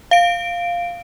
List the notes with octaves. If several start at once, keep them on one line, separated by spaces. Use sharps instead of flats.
F5 D7